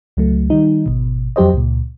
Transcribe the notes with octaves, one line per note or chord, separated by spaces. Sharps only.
C#2 F#3 A3
D#3 G3 D#4
G#1 B2
F2 F#3 G4 C5 D#5
C#2 A#2